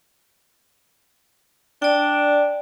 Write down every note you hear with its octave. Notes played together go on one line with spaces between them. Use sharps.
D4 D5 G5